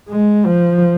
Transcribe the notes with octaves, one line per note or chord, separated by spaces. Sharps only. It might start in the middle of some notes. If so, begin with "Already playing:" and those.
G#3
F3